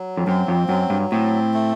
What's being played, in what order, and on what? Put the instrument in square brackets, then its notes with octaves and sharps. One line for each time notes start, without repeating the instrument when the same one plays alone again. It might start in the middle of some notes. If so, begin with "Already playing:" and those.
Already playing: [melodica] F#3
[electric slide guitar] F2
[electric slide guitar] F#2 [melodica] C4
[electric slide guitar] F2
[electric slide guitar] F#2 [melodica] F#3
[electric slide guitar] G2
[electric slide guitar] A2 [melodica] C4
[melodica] A3